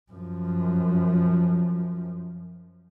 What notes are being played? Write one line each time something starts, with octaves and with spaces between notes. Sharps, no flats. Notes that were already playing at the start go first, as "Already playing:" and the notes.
F#2 F3